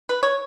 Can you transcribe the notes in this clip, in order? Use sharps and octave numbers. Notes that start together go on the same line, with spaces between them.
B4
C#5